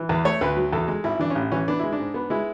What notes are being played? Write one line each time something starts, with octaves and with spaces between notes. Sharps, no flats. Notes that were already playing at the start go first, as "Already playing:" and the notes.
Already playing: E3
E2 B4
A3 C#5
D2 B4
F#3
E2 A4
G#3
G#1 E4
E3 D4
A1 C#4
E3 C#4
B3 D4
G#3 E4
D4
G#2
B3
G#3 E4